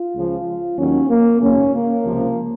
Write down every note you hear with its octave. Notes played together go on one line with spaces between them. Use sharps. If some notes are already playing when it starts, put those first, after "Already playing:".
Already playing: F4
C#2 C#3 F3
D#2 D#3 F#3 C#4
A#3
G#1 F#2 C#3 C#4
A#3
C#2 C3 F3